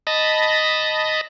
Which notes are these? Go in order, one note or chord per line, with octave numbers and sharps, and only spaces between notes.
D#5 A5 B5 A#6